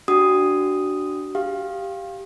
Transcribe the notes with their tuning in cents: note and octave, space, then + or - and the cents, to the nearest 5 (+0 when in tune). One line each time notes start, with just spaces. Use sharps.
D4 +0 F#4 +25 D#6 +0
G4 +0 F5 +0